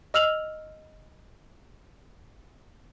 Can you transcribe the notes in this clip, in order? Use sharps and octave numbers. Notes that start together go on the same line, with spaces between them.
D#5 E6 F6 F7 F#7